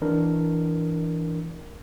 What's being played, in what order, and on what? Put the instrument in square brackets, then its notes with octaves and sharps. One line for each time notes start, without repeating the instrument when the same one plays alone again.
[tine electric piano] E3 D4 A#4